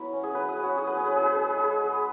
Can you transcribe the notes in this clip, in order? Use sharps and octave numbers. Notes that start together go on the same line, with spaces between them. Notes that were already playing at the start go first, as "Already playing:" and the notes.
Already playing: F#3 B3 E4 F#4 B4
C#4
G#4
F#3 B4
G#4
C#4
F#4
F#3 G#4
B4
C#4 G#4
B4
G#4
G#3 B4
G#4
G#3
G#4
G#3 B4
G#3